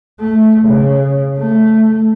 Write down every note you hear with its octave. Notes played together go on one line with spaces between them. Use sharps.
A3
C#3
A3